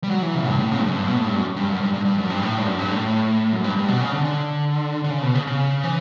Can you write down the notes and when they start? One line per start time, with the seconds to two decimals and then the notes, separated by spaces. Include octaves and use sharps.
0.04 G3
0.10 F#3
0.22 E3
0.34 C#3
0.47 G2
0.59 A2
0.72 C#3
0.79 G2
0.84 F#2
0.96 G2
1.08 B2
1.17 A2
1.26 G2
1.36 F#2
1.56 G2
1.69 F#2
1.81 G2
1.94 G2
2.05 G2
2.18 F#2
2.30 G2
2.42 A2
2.58 G2
2.66 F#2
2.79 G2
2.91 A2
3.53 F#2
3.64 G2
3.77 G2
3.88 B2
4.01 C#3
4.13 D3
4.25 D3
5.04 D3
5.10 C#3
5.23 B2
5.35 C#3
5.47 C#3
5.83 E3